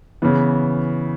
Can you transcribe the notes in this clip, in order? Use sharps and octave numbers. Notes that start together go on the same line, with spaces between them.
C#3 E3 B3